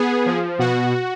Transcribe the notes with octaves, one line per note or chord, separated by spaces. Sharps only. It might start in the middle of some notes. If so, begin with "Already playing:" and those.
Already playing: B3 G#4
F3
B2 F#4